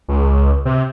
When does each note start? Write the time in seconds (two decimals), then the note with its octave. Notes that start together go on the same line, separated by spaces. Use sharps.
0.08 C#2
0.65 C3